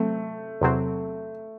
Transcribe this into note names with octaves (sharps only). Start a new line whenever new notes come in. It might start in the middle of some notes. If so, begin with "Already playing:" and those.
Already playing: C3 F#3 A3 C4
E2 C3 F#3 C4